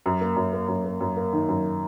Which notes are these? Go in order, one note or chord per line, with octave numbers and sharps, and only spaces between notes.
F#2
A#3
F#2
A#3
F#2
A#3
F#2
A#3
D#3
F#2